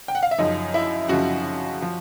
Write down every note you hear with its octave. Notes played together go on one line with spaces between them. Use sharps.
G5
F#5
F5
E5
F#2 C#3 F3 D#4 D#5
E4 E5
F#2 C#3 F3 F#4 F#5
F3